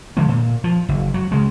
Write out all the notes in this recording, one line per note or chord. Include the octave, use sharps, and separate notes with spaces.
D3 F3 G#3 A3
A#2
F3
F#1
F#3
C#3 G#3